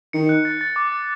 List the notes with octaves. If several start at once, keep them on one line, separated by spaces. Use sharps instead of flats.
D#3 C#7
F#6
A6
A6
D6
C#7